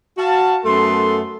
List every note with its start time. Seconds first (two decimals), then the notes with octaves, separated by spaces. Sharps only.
0.17 F#4 F5 A5
0.64 F#2 A3 B3 A4 C6